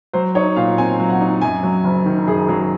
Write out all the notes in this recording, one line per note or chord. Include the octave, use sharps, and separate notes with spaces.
F#3 C5
D#4 C#5
A#2 F5
C4 G#5
F#3
F#5
D#4
F#2 G#5
F#3
F#1
D#3
F#2 G#4
F#3 G#4